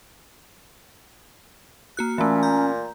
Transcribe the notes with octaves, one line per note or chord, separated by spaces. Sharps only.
A#3 F#4 F#6
A#2 E3 A3 C#4
A#5 G6